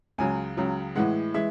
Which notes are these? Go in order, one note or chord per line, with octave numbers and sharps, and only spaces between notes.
C#2 C#3 F#3 G#5
C#2 C#3 F#3
A2 E3 G#3 F#5
E3 G#3 E5